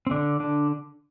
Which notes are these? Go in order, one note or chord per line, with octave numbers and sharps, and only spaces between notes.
C4
D3 D4
D3 D4